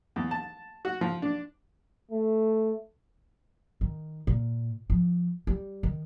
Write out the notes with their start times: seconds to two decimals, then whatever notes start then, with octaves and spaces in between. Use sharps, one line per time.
0.16 E2
0.31 A5
0.85 F#4
1.01 F3
1.22 D4
2.11 A3
3.81 D#3
4.27 A#2
4.90 F3
5.47 G3
5.83 D#3